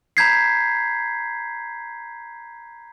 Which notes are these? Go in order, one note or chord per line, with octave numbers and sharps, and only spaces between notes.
A#5 B5 G6 G#6 B6 C7